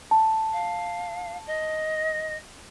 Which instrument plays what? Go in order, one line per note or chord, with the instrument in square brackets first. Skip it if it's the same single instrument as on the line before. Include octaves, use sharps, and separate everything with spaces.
[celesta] A5
[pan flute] F5
D#5